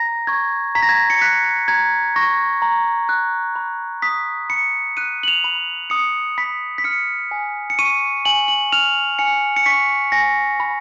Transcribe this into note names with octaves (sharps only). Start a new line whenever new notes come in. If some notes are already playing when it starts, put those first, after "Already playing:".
Already playing: A#5 A#6
C#6 G#6
A#5 B6
A#6
G#6
A#6
C#7
F#6 B6
A#5 G#6
C#6 A#6
A#5
F#6
B5
D#6 B6
B5 C#7
F#6 D#7
F#7
F7
B5
D#6 C#7
B5 B6
B6
F6 C#7
G#5
C#7
C#6 D#7
G#5 F#7
F#7
F6 F7
G#5 C#7
C#7
C#6 B6
G#5 A#6
B5